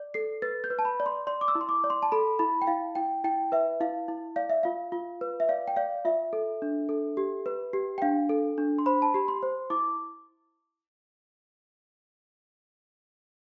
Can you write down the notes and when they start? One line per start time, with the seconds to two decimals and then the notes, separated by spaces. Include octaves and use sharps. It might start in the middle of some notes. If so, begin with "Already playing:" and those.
Already playing: D5
0.14 A4 C7
0.42 B4 A6
0.64 G6
0.70 B4
0.79 A5
0.85 B5
1.00 D5
1.06 C6
1.27 D5 C6
1.41 D6
1.48 E6
1.55 E4
1.61 C6
1.69 D6
1.84 D5
1.90 C6
2.03 A5
2.12 A4 B5
2.39 E4 B5
2.62 G5
2.67 E4 F5
2.95 E4 G5
3.24 E4 G5
3.52 B4 E5
3.81 E4 F5
4.08 E4
4.36 D5 F5
4.50 E5
4.63 F4 F5
4.92 F4
5.21 B4
5.40 E5
5.49 D5 F5
5.68 G5
5.76 D5 F5
6.05 F4 E5
6.33 A4
6.62 D4
6.89 A4
7.17 G4
7.46 B4
7.73 G4
7.98 G5
8.02 D4 F5
8.29 A4
8.58 D4
8.78 C6
8.86 C5 B5
9.02 A5
9.14 G4 B5
9.28 C6
9.43 C5
9.70 E4 D6